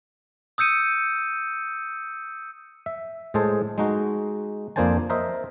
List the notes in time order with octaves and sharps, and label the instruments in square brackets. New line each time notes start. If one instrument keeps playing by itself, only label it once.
[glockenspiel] D#6 E6 G6 C#7 D#7
[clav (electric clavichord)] E5
A2 G#3 G#4 A4 C5 A5
G#3 D#4 F#4
F2 A#3 D4 C5 G#5 A5
A#4 C5 D#5 E5